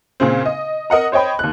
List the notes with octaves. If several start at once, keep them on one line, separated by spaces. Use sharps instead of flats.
A#2 C#3 C4
D#5
A#4 D#5 F#5 A#5
C5 C#5 D#5 G5 B5
D#2 F#6